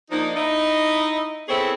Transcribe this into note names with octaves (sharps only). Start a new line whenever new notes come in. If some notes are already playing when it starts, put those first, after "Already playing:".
F3 A#3 D4 D#4
D#4 E4 D#5
B3 C4 E4 G#4 A4 C#5